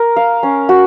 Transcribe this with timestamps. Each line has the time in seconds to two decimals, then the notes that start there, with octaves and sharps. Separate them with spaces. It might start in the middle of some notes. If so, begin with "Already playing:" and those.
Already playing: A#4
0.16 F5
0.43 C#4
0.69 F#4